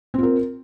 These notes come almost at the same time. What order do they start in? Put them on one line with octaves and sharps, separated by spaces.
C4 F4 A#4